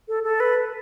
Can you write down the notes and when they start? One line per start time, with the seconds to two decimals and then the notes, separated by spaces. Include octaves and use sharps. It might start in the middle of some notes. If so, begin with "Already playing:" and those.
0.08 A4
0.24 A4
0.40 B4